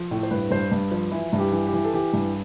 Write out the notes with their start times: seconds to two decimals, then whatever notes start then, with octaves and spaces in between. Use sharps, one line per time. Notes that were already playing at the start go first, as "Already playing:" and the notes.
Already playing: F3
0.11 A2
0.23 C5
0.31 G2 B4
0.51 G2 C5
0.72 G2
0.91 F3
1.11 E3 E4
1.33 G2
1.39 G4
1.52 E3
1.67 G4
1.73 E3
1.85 A4
1.93 E3 G4
2.13 G2